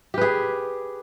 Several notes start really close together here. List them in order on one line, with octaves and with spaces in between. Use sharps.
G4 B4 G#4